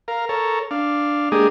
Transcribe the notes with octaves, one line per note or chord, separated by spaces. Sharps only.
A#4 F5
A4 A#4 C#5
D4 F5
G#3 A#3 D4 G4 G#4 D#5